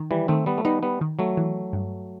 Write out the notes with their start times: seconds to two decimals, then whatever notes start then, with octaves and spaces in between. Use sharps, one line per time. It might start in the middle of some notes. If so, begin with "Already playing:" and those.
Already playing: D#3
0.11 E3 G3
0.28 D#3 A3 C4
0.46 G3 B3
0.58 A3
0.65 G3 B3 D#4
0.83 G3 B3
1.01 D#3
1.19 F#3 A3
1.37 E3
1.73 G2